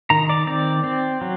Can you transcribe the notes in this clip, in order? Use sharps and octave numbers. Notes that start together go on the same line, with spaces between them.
D#3 A#5
D5
C4 D5
C4
F#3